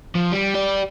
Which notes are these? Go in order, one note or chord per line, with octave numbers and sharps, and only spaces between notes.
F3
G3
G4 D5